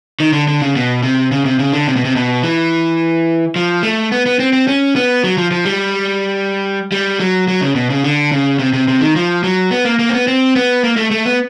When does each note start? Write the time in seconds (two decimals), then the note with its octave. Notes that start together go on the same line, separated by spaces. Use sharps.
0.20 D#3
0.33 D3
0.48 D3
0.62 C#3
0.76 B2
1.03 C3
1.32 C#3
1.45 C3
1.59 C#3
1.73 D3
1.88 C3
1.96 B2
2.05 C3
2.16 B2
2.43 E3
3.56 F3
3.83 A3
4.12 B3
4.26 B3
4.39 C4
4.53 C4
4.68 C#4
4.96 B3
5.24 F#3
5.38 F3
5.51 F3
5.65 G3
6.92 G3
7.20 F#3
7.48 F#3
7.61 C#3
7.75 B2
7.90 C#3
8.04 D3
8.32 C#3
8.59 C3
8.73 C3
8.88 C3
9.01 D#3
9.16 F3
9.43 F#3
9.71 B3
9.85 A#3
9.99 A#3
10.09 C4
10.13 B3
10.28 C4
10.56 B3
10.83 A#3
10.97 A3
11.11 A3
11.26 B3